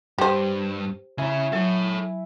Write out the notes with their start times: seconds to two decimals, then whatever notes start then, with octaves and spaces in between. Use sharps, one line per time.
0.18 G2 G4 C5
1.18 C#3 E4 C#5 G#5
1.53 F#3 A4 C#5